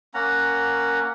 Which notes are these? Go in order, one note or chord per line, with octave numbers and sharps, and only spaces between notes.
A#3 C#4 F#5 A#5